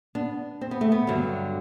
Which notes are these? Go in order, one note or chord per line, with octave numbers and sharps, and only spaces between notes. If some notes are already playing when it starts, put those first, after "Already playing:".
B3 D4
C4
B3
A3
B3
G2 D3 F#3